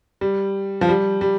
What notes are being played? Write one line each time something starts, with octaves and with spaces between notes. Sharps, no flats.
G3
F3
G3
G3